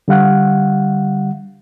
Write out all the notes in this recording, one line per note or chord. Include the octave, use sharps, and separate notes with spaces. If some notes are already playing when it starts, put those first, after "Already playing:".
D3 G3 F5 F#5